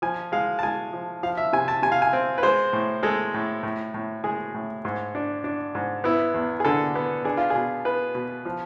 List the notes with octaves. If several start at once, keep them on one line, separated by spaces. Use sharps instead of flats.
F3 G#5
G#3 F5
A5
G#3 G#5
F3
F3 F5
E5
C3 G#5
A5
C3 G#5
F5
G#5
C4
B4
G#3 C5
A2
G#3 A4
A2
A2
A2
G#3 G#4
A2
G#2
D4
D4
G#2
B3 E4
E2
G#4
D3 A4
B3
D4 G#4
F4
B2 G#4
B3 B4
B2
F3